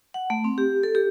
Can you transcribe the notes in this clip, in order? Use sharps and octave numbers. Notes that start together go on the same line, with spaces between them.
F#5
A3
C4
G4
A4
G4